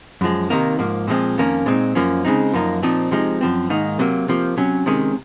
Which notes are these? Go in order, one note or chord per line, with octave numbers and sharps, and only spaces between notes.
F#2 F3 G#3
C3 D#3 A#3 D#4
G#2 F3 A#3
A#2 F3 G#3 C4
F2 D#3 A#3 C#4
A#2 G#3 C4 D#4
F#2 F3 A#3 C#4
C#3 G#3 C4 D#4
F#2 F3 A#3 D#4
A#2 F3 C4 D#4
C3 F3 G#3 D#4
F#2 F3 C4
G#2 D#3 A#3 D#4
C3 F#3 A#3
C3 F3 A#3
C3 F#3 C#4
C3 D#3 G#3 C#4